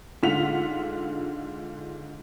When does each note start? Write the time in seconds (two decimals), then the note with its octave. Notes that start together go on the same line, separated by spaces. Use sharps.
0.23 G#2 D3 F4 F#5 B6 F7